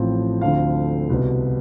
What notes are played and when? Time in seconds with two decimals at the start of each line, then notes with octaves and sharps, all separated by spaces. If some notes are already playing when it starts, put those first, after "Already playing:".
Already playing: A1 A2 F3 C4
0.41 D2 D3 F3 A3 C4 F5
1.10 C2 B2 B3